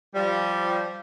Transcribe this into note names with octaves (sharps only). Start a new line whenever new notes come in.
F3 G3